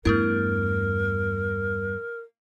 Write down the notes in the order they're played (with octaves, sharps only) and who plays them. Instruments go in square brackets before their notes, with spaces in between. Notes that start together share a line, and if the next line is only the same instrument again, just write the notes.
[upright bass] E2 G2 [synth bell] A3 B3 E4 [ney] A#4